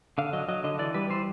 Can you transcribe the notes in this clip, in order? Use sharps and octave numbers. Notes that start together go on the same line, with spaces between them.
D3 F5
F#3 D#5
F#3 D#5
D3 D#5
E3 D5
G3 B4
E3 C5